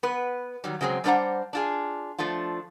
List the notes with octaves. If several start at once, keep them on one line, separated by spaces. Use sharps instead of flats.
B3 B4
D#3 F#3 G3
C#3 F#3 G#3 C4
G3 A3 D4 C5 F#5 A#5
D4 F4 G#4
F3 A3 D4 F4